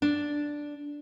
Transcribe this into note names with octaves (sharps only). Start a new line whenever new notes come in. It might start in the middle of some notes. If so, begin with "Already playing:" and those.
D4